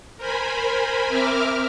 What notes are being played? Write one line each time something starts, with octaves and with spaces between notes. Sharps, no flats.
A#4 C5 G#5 B5
C4 A#4 E5 D6 F6